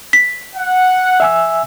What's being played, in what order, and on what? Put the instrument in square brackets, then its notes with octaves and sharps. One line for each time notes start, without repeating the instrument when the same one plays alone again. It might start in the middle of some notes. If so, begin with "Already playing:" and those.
[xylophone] B6
[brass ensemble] F#5
[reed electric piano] E5 G#5 E6